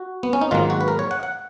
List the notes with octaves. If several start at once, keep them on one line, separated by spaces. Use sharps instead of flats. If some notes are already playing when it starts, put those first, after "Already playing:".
Already playing: F#4
B3
C#4
D#4
G#2 D#3 F#3 A#3 F4
F#4
B4
A#4
C#5
F#5
F#5